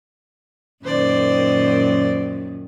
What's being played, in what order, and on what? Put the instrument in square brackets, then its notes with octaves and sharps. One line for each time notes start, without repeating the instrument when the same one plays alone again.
[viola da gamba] F#2 A#2 D#3 [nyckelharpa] C5 D5